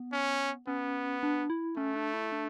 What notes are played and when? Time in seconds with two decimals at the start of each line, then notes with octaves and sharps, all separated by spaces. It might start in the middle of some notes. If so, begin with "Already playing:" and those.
Already playing: B3
0.13 C#4
0.67 B3 C#4
1.23 D4
1.50 E4
1.77 A3 C#4
1.96 D4
2.14 E4
2.32 D4